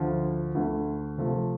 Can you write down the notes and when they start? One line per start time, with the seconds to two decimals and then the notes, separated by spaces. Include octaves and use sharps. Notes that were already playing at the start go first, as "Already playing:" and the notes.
Already playing: D2 D3 F3
0.55 D2 D3 A3
1.18 C3 F3 A3